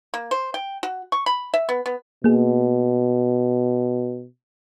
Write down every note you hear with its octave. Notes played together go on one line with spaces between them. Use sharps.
A#3
C5
G5
F#4
C#6
B5
E5
B3
B3
B2 A#3 G#4